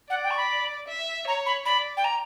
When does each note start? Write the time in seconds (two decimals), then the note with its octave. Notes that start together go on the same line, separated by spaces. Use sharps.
0.10 D5 F#5
0.24 G5
0.31 C#6
0.37 B5
0.88 E5
1.27 C#5 A#5
1.46 B5
1.65 D5 B5
1.97 G5
2.04 A#5